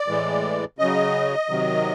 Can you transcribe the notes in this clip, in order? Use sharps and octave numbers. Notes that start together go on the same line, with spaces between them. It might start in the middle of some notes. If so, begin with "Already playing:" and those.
Already playing: D5
A2 E3 G#3
C#3 F#3 D#5
C3 D#3 F#3